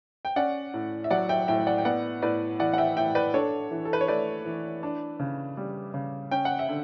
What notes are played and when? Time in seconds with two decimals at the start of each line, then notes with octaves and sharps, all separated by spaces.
0.25 G5
0.36 C#4 D5 F#5
0.74 A2
1.04 E5
1.10 F#3 D5 F#5
1.29 E5 G5
1.48 A2 E5 G5
1.67 D5 F#5
1.78 G5
1.85 B3 D5 F#5
2.22 A2 B4 D5
2.59 E3 D5 F#5
2.74 F#5
2.78 E5 G5
2.97 A2 E5 G5
3.15 B4 D5
3.34 D4 A4 C#5
3.71 E3
3.85 A4
3.93 B4
4.01 C#5
4.08 A3 B4 D5
4.45 E3
4.83 D4
5.20 C#3
5.57 G3
5.94 C#3
6.31 C#4 G5
6.45 F#5
6.59 E5
6.69 D3